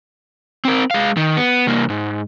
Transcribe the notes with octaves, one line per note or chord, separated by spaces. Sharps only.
C4 A#4
G#3 F5
D#3
B3
C2 A#3
G#2